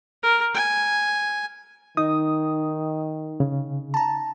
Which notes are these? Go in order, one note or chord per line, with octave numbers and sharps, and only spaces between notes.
A#4
G#5
D#3 D#4 D#6
C#3
A5 A#5